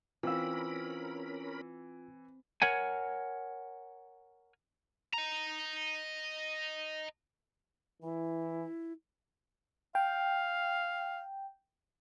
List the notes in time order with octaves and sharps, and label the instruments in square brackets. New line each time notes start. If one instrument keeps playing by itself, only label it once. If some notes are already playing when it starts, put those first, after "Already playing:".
[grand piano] E3 [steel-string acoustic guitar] C4 F5 [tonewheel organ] C#4 A#4 B5 [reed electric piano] F4 E6
[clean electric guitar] A#4 C#5 F#5 G#5
[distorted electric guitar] D#5 A#5
[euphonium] E3 [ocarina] E4
[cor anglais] F5 [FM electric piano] G5